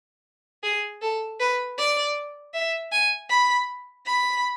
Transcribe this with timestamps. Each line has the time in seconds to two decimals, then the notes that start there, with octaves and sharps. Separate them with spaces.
0.63 G#4
1.02 A4
1.40 B4
1.78 D5
2.54 E5
2.92 G#5
3.30 B5
4.06 B5